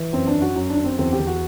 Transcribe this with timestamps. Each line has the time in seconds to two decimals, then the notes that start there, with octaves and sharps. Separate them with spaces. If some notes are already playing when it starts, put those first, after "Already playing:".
Already playing: E3
0.13 F#2 C4
0.27 D4
0.34 F#2
0.42 F#4
0.56 F#2
0.70 D4
0.77 F#2
0.84 C4
0.98 E2 C4
1.13 G4
1.19 E2
1.27 F#4